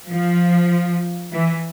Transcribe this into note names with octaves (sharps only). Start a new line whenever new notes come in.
F3
E3